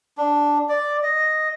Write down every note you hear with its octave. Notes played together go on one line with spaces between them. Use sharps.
D4
D5
D#5